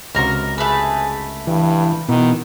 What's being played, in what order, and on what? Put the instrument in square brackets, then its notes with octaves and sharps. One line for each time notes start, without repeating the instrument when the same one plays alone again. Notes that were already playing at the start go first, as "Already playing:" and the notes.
[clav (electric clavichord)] C#2 C3 F#4 [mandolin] A#4 A#5
[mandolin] A3 B4 [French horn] G#4
[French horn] G2 [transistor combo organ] E3
[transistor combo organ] B2 B3 [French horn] D#3 [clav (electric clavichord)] E3